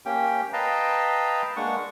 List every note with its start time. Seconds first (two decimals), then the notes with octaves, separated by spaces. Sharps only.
0.06 A#3 C#4 G4 G5
0.53 B4 D#5 F5 G5 A5 A#5
1.56 G#3 A#3 D4 F#5 C#6